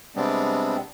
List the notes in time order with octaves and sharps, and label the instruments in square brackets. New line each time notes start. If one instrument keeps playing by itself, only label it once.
[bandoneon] C3 G3 G#3 B3 C4 D4